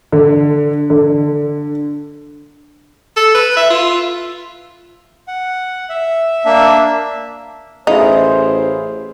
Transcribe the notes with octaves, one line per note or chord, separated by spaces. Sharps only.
D3
D3
A4
B4
E5
F4
F#5
E5
A#3 D4 E5
A1 D#4 E4 G#4 C5 F5